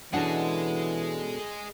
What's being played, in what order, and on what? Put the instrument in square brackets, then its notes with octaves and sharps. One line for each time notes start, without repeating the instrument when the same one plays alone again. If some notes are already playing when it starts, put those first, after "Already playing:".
[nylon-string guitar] B2 C#4 D4 [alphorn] E3 [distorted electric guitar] G#4 D#5 [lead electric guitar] A4 F#5